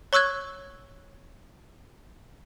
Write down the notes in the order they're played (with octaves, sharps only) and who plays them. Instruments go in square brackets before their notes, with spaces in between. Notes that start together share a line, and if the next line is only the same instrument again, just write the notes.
[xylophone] C#5 C#6 E6 F#6 G#6